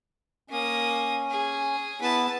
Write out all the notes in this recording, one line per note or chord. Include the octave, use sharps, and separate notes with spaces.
A#3 C#4 D#6
G#4
B3 E4 B4 A5